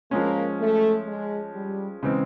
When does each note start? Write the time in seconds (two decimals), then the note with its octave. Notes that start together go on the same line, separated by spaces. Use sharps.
0.11 F3 G#3 A#3 C#4
0.60 A3
1.07 G#3
1.54 G3
2.03 C#3 E3 G#3 C4